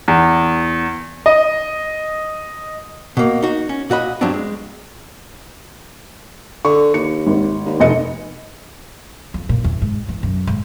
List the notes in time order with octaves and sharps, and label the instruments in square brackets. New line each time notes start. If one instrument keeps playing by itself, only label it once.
[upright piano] E2
D#5
[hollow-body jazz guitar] B2 A#3
D#4 F#4
C#4
A#2 F#4 D#5 B5
G2 F3 F#3 B3 C4 D4
G#3
[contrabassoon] D3 [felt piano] C#6
[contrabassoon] D#2 [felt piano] C#7
[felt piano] G#1
[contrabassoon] D#2
[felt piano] F1 D#5 C#7
[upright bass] F2
A#2
E2
G#2
E3
F#2
G#2